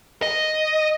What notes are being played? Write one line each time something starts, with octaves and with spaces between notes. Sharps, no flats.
D#5